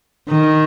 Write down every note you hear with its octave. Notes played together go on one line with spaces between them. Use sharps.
D#3